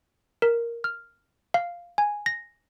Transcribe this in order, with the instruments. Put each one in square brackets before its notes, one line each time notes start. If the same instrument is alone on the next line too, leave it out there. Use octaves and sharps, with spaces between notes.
[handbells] A#4
F6
F5
G#5
A#6